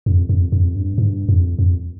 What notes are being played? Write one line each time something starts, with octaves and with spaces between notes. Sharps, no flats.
F2
F2
F2
G2
G2
F2
F2